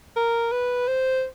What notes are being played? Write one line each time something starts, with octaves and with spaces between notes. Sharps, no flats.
A#4
B4
C5